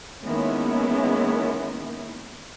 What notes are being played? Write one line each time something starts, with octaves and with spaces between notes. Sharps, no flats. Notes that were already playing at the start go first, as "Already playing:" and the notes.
D#3 G#3 A#3 B3 C#4 E4